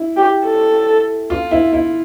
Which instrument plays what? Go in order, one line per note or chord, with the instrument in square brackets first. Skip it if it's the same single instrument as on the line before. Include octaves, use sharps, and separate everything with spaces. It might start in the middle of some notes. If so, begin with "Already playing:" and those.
Already playing: [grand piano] E4
[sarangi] G4
A4
[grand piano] F4
E4
E4